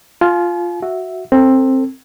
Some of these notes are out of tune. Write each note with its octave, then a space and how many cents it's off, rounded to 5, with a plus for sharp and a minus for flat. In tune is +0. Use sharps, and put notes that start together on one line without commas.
F4 +0 G#5 +45
F#4 +0 E5 +0
C4 +15 A4 +30